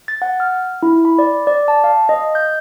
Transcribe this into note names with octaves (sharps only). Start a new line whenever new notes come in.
A6
F#5
F6
E4
B5
D5
D5
A5
F5
D#5
G6